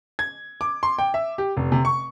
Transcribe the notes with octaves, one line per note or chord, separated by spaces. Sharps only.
G#6
D6
C6
G5
E5
G4
F1
C3
C#6